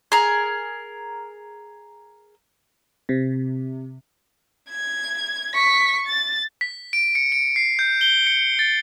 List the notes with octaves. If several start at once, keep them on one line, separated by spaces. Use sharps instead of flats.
G#4 A#4
C3
G#6
C#6 B6
A6
B6
D7
C#7
D7
C7
G6
G7
C#7
A6